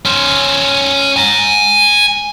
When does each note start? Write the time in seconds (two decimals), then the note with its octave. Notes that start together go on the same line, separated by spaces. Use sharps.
0.05 C#4 C5
1.17 G#5 A#5